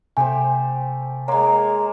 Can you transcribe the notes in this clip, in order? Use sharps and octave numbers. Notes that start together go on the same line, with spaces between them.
C3 A3 G4 C5 G5 G#5
G#3 A#3 C#5 A#5 C6